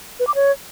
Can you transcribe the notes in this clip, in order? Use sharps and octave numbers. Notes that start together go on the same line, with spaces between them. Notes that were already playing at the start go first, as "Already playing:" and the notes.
B4
D6
C#5